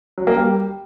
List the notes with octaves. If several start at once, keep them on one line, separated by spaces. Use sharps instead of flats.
F#3
A#3
G3